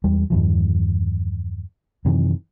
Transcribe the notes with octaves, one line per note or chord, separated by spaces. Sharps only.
E2 G3 G#3
E2 G2 D#3 F3
F#2 C3 D#3 E3